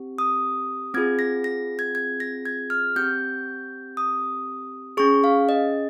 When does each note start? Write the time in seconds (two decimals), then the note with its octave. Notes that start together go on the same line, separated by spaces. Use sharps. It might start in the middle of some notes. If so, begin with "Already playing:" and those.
Already playing: C4 G4
0.18 D#6
0.94 C4 F4 G#4 G#6
1.19 A#6
1.44 A#6
1.79 G#6
1.95 G#6
2.20 A#6
2.45 G#6
2.70 F6
2.96 C4 G4 G6
3.97 D#6
4.97 C#4 G#4 C#6
5.24 F5
5.49 D#5